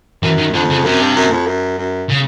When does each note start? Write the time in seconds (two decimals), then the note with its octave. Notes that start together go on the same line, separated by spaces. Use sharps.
0.23 F#2 E3
0.38 D#3
0.53 F2 D3
0.70 C#3
0.85 F#2 C3
1.01 G2
1.16 F#2
1.32 F2
1.47 F#2
1.78 F#2
2.10 C#3